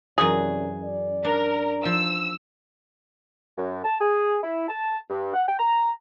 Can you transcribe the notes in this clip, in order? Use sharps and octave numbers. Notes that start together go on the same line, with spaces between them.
F#2 C3 E3 F#4 G#4 D5
D5
D4 A#4
F3 E6
F#2
A5
G#4
E4
A5
G2
F#5
G5
A#5